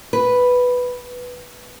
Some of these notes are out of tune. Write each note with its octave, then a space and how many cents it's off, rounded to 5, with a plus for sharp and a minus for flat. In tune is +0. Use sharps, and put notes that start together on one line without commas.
B4 +0